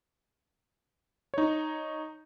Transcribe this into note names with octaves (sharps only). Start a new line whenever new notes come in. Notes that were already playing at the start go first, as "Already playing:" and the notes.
D#4 C#5